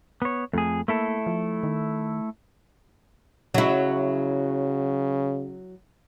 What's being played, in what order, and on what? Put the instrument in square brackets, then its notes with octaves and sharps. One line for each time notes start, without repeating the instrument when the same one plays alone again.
[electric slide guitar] B3 C#5
[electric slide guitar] F2 G#4 [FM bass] A3
[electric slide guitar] A3 E4 A4 [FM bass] A#3
[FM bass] F3
D#3
[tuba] C#3 [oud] F#3 E4